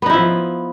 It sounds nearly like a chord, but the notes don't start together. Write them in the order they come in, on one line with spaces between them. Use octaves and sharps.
B3 D#4 E4 F3